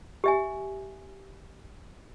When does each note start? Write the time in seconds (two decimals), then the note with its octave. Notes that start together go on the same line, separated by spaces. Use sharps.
0.24 G4 E5 G#5